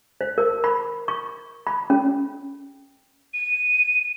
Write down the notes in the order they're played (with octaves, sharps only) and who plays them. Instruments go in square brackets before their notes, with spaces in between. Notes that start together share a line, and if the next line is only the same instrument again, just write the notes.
[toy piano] C5
A#4
B5
C#6
B5
C#4
[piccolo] D#7